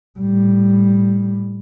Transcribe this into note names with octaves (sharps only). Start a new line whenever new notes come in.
A2 G3